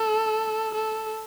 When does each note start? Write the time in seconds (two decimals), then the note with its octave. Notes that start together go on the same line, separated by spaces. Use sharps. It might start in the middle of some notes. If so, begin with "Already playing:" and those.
Already playing: A4
0.75 A4